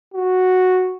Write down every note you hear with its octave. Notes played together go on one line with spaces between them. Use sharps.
F#4